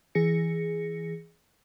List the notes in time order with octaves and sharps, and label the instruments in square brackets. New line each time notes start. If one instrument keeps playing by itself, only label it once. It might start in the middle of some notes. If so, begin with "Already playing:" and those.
[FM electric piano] E3 G#4 A#6 C#7